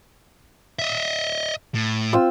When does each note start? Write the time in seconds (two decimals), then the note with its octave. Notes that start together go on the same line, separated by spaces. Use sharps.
0.79 D#5 E5
1.75 A2
2.13 C4 F4 E6